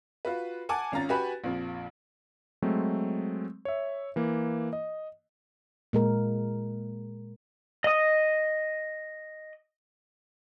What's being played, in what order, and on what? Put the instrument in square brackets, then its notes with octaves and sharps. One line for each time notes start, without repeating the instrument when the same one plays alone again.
[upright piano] F4 F#4 B4
F#5 G#5 A5 D6
G#1 C#4 F4 A#5 A6
F#4 G4 B4 G#5 B5
A#1 F2 F3
[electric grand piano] F#3 G#3 A3 C4
C#5 E5
E3 A#3
D#5
[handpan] A#2 G#3 A#4
[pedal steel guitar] D#5 D#6